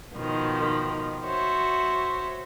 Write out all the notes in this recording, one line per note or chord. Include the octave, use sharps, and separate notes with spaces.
B2 D#3 F3
F#4 C5 C#5 E5